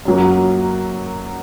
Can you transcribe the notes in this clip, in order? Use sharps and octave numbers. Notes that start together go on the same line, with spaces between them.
F#2 F#3 A#3